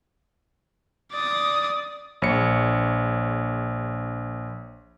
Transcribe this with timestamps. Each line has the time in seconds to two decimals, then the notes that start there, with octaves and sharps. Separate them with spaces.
1.12 D5 D#6
2.22 A#1 C#5 C#7